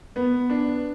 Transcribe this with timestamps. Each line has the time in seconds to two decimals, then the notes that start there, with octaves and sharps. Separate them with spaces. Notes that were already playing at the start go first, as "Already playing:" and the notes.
0.16 B3
0.50 D4